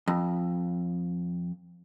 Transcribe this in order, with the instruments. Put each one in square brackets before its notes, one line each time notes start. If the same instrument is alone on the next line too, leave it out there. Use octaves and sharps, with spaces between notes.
[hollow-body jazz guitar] F2